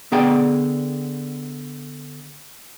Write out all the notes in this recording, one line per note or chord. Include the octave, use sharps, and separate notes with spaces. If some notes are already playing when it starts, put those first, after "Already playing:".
D3 B3 G#4 D5 G5